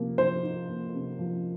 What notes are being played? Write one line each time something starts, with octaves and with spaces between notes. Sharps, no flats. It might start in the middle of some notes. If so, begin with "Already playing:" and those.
Already playing: C3 F3 A#3
F3 C5
D#4
A#3
C3
F3